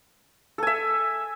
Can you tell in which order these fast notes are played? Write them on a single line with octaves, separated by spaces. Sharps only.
A4 G#5 E5